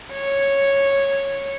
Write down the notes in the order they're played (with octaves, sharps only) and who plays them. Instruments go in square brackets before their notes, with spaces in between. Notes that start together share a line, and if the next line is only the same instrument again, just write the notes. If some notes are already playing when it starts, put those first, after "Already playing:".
[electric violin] C#5